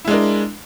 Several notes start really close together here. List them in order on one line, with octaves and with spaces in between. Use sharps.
E4 G#3 D4 A#4